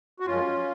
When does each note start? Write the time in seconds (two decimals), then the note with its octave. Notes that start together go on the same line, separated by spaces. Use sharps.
0.20 F#4
0.27 F#2 F3 G#3 C#4 F4